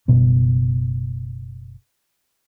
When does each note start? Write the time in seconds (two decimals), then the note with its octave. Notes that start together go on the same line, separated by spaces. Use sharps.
0.08 F#1 B2 G3 B3